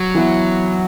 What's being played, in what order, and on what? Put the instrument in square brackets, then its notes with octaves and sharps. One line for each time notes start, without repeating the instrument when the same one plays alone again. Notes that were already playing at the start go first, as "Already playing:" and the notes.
Already playing: [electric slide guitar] F#3
[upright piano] E3 B3 E4